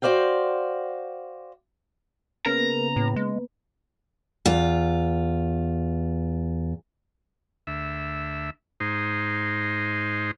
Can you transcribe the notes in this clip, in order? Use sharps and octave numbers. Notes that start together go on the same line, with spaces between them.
F#4 C5 D5 F5 G5
C#3 A#3 B3 A#4 B4 A#5
A2
G#3
E2 F4
D2 E5
G#2 D#4 C5